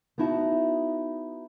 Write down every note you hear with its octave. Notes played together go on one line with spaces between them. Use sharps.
B3 D#4 E4 F#4 A5